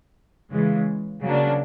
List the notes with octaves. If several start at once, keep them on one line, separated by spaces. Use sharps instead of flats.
C#3 E3 G#3
C#3 F#3 A#3 D4